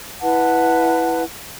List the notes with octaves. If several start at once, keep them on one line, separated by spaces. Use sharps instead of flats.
E4 B4 F#5 A5